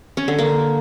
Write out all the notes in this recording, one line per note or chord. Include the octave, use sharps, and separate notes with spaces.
C#4
D3
A#3